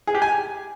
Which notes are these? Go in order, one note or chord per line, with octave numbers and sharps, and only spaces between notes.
G#4
G4
G#5